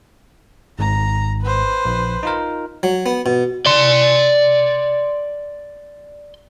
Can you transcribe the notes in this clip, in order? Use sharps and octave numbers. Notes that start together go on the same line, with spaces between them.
G#1 G#2 A#5
B4 C5
A#1
D#4 F4 A#4
F#3
B3
B2
D5 C6